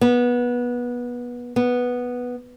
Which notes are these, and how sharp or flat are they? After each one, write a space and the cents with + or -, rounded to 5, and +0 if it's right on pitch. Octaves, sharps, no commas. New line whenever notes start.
B3 -20
B3 -5